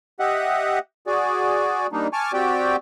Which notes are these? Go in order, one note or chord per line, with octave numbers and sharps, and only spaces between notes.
G4 D#5 E5 F#5
F#4 G#4 D5
G3 A#3 D4 D#4
G#5 A5 C#6 D6 F6
C4 F#4 G4 D5 G5